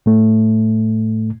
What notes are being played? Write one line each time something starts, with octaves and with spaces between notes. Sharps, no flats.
A2 A3